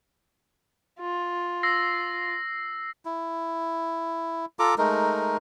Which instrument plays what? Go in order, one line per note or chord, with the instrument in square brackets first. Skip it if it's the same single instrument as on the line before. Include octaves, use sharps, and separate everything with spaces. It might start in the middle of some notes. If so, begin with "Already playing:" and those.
[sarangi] F4
[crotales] E6 A#6 C7
[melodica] E4
F4 A4 A#5 D6
G#3 A3 D#4 A#4